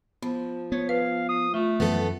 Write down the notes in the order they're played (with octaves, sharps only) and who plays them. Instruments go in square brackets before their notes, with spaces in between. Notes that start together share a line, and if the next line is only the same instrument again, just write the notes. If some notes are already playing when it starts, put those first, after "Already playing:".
[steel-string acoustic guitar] F3 [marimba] B3
[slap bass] B3 [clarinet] C#5
[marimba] B4 [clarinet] F5
[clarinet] D#6
[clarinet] A3 [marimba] F4
[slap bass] F#2 E3 F3 [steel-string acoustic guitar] B3 A4